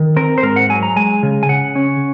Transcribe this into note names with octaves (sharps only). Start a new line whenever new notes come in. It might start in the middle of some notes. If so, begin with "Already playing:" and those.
Already playing: D#3
C4 A#4
C5
G#2 A#4
F#5
F#3 G#5
A#5
G#3 G#5
C#3
G#5
C#3 F#5
C#4